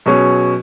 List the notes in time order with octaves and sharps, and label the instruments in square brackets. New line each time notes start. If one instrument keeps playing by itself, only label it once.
[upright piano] B2 F#3 C#4 G#4 C#5